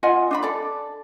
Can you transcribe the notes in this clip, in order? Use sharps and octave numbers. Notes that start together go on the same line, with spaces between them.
F4 D#5 F#5 G#5
D4 D#5 B5
A4 D5